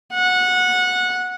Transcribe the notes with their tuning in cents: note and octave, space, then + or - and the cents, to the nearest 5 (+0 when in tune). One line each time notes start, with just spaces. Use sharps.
F#5 -20